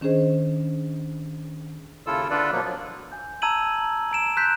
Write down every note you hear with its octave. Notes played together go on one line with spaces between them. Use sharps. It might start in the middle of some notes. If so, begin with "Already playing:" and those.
D#3 C#4 D4 G#4 C5 D#5
D#2 C#3 E4 F4 A4 E6
D3 D4 F4 A4 B4 D5
B2 F3 F#3 A#3
F3 F#3
G#5 G6
A5 A#5 E6 G#6 D#7 F#7
A#5 D7 E7
C6 F#6 G6 B6